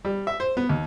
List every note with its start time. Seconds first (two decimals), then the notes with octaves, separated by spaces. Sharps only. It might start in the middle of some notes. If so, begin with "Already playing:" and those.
0.05 G3
0.27 E5
0.40 C5
0.57 B3
0.69 D#2